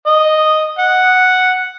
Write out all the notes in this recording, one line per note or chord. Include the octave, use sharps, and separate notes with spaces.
D#5
F#5